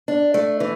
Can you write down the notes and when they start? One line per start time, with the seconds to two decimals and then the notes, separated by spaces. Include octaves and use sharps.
0.08 D4
0.34 A3
0.60 E3